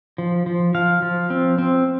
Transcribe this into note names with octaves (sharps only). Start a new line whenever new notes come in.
F3
F3
F3 F5
F3
C4
C4